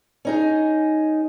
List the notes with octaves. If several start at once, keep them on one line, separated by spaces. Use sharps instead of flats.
C#4 D#4 G#4